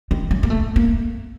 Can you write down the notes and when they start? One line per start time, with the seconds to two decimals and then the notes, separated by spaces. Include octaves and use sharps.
0.11 D#3
0.31 F#3
0.43 A#3
0.50 A3
0.76 A#3